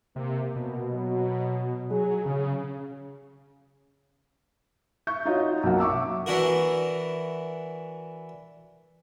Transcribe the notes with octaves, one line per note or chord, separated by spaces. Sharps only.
C3 A#3
B2 A#3
F#3
B2
F#3 G#4
C#3 C#4
E5 C#6 G6
D#4 F4 F#4 C#5 D#5
B1 F#2 A#3 F#5
E5 C#6 D6 E6
E3 D4 E4 F#4 A#4